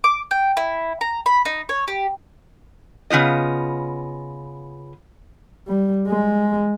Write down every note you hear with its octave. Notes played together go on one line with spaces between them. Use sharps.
D6
G5
E4
A#5
B5
D#4
C#5
G4
C#3 B3 F4 D#5
G3
G#3